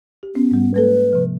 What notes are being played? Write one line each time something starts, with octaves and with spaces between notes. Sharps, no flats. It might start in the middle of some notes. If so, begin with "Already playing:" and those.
G4
B3 C#4
G#2 G3
G#3 A#3 A4 B4
C3 F3